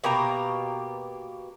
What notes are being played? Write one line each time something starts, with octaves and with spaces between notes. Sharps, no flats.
B2 A#3 G4 A#5